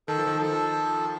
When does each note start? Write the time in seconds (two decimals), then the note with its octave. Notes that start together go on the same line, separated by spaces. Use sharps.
0.08 D#3 A4
0.18 F3
0.27 D#3
0.42 F3 A4